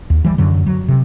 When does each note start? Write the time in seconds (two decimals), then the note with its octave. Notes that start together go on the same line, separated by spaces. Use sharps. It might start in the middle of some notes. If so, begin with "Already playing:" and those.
0.10 D#2
0.24 E3 G3
0.38 F#2 D3 F#3
0.66 F#3
0.88 C3